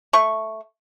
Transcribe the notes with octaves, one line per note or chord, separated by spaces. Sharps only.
A3 C#6